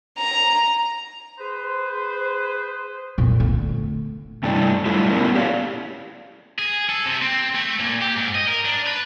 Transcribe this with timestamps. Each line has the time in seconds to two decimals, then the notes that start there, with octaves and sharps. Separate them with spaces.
0.18 A#5
1.39 G#4 B4 C5
3.18 F2 A#2
3.40 D3 A3
4.43 G2 C3 G3 A3 D4 E4
4.85 F#3 G3 A3 D4 E4 F4
5.11 A3 B3 C#4 E4 A#4
5.35 G4 C#5 D5 F5
6.59 G#4
6.90 A4
7.06 C3
7.22 C4
7.55 A3
7.80 A#2
8.01 G4
8.16 G#2
8.35 D#5
8.47 A#4
8.65 D4
8.86 B4